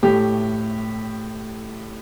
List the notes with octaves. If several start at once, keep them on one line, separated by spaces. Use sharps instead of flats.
A2 A3 G4